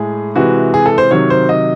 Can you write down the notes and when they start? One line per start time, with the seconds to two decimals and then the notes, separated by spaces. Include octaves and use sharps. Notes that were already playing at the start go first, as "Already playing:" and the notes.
Already playing: A2 G#3 G#4
0.35 C3 E3 G#3 F#4
0.74 G#4
0.86 A4
0.98 C5
1.11 C3 D#3 F#3 C#5
1.30 C5
1.49 D#5